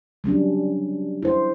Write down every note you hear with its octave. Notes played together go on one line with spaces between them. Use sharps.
F#3 G3 C#4 D4
E4 C5